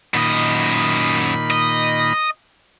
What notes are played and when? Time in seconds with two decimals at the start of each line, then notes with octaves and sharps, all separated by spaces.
0.14 F#2 A#2 D#3 D#5 B5
1.51 D#5